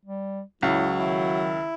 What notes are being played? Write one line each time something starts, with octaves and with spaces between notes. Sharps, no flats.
G3
C#2 F#3 E4
D#3 E4